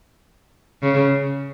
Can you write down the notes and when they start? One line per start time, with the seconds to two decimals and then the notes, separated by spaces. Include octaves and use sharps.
0.82 C#3